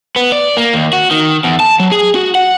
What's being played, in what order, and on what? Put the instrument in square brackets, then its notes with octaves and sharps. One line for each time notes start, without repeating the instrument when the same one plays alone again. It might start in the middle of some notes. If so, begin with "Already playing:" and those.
[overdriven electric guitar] B3
D5
A#3
D#2
F#4
D#3
E2
A5
F#3
G#4
F#4
F#5